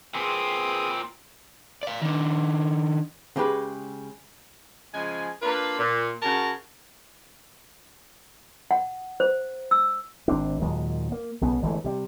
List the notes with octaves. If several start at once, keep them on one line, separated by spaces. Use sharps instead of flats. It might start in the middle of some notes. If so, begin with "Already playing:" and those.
A#2 C4 G#4 B4 D#6
D5 F5
D#3 D4
C#3 G#3 G4 B4
C#3 F3 G#3 G#5
A#3 D4 F4 B4
A#2
C#3 F#4 A#4 A5 A#5
F#5
C5
E6
G#1 C4 D4
D#2 A#2 F#3 G#3
A#3
B1 C#3 B3
G1 E3 G#3 A3
C3 G3